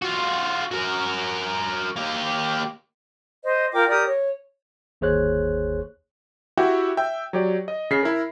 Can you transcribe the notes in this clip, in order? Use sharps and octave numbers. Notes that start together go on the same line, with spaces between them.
F4 F#4
F#4 A#4
A#3 G4
C5 D#5
F4 A#4 G5 D6
G4 A#4 D5 D#6
C#5
G1 D#2 G#4 C5 C#5 F#6
E4 F#4 G4 E5 F#5 G5
E5 G5
F#3 G4 D5
D#5
C#3 B6 C7
E4 A#4